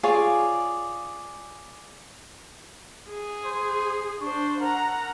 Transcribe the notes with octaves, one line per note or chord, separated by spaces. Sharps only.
F4 G#4 C#5 D5
G#4
C5
D4 C5 C#6
A#4 F#5 A#5